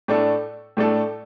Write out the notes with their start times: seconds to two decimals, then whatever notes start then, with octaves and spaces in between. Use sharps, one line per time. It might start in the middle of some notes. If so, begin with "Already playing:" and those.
0.08 A2 A3 D4 A4
0.77 A2 A3 D4 A4